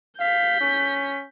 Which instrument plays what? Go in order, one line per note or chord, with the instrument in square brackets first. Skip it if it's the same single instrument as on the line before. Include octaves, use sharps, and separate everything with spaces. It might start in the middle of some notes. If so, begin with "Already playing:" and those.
[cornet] F5 [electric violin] G6 B6
[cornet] C#4